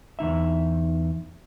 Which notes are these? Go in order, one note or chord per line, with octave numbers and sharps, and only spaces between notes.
E2 D#3 D#4 E5